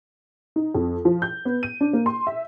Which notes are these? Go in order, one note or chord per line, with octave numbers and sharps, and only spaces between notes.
D#4
F2
F3
G6
B3
D#7
D4
A#3
C6
E5